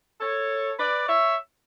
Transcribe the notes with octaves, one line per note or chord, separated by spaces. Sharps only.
A4 C#5
B4 D5
C#5 E5